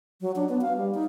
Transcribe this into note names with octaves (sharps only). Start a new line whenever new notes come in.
F#3
D4
B3
F5
G3
D#4